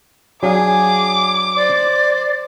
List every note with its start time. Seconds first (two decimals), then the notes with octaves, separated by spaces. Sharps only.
0.43 F#3 D4 G#4 F5 D6
1.56 C5 D5